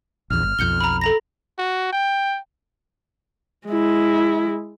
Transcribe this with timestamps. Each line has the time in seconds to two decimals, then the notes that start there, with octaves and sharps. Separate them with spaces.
0.30 A#1 E2 F6
0.43 G1
0.59 B1 F2 G6 C#7 G7
0.81 A#5 B5
1.01 A4 A#5 A#6
1.58 F#4
1.93 G5
3.67 G#3 E4